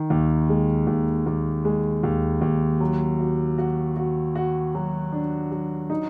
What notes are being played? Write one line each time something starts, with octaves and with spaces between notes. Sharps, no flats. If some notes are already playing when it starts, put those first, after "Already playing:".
Already playing: D#3
D#2
G#3
D#2
D#2
G#3
D#2
D#2
F#3
F#4
F#4
F#4
F#4
F#3
D4
F#3
D#4